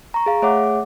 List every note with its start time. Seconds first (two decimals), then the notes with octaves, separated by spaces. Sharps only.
0.14 A#5 C#6
0.26 G#4 F5
0.42 A3 G#4 C#5 E5 F#5 D6